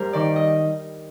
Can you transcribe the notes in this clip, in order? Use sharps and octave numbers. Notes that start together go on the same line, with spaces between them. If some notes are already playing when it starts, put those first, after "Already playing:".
Already playing: G2 G3 A#4 C5
D#3 D5
D#5